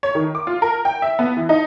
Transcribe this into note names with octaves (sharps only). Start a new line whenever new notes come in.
C#5
D#3
D6
F4
A#4
G5
E5
B3
E3
D#4